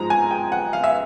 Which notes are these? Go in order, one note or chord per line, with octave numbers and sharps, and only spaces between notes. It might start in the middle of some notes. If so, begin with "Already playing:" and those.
Already playing: G#2 F3 G#3 A#5
G#5
G5
F#5
F5
E5